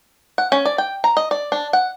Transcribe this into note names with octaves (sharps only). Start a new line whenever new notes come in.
F#5
C#4
D5
G5
A#5
D#5
D5
D4
F#5